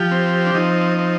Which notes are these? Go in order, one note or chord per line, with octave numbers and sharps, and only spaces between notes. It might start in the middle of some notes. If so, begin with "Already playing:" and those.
Already playing: F3 G4
C4
D4
F3 D#4
C4